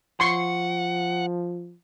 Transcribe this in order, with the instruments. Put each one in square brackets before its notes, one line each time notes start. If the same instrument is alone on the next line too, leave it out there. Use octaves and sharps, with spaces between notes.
[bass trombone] F3 [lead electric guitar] F#5 [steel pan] C6 C#6